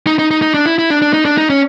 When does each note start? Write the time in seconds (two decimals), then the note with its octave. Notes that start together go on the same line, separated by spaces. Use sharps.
0.07 D#4
0.19 D#4
0.31 D#4
0.42 D#4
0.54 D4
0.66 E4
0.79 E4
0.90 D4
1.02 D4
1.13 D#4
1.25 D4
1.38 D#4
1.50 C#4